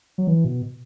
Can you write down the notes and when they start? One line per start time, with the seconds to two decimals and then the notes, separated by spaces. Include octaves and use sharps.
0.18 F#3
0.27 E3
0.44 B2